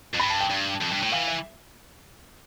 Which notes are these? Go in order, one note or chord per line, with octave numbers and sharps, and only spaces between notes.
F2
G2 B5
A5
G5
G2
F2
G2
A2
E3 F5
E5